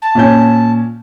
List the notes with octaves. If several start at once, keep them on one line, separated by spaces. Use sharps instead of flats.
A5
A#2 C#4 G6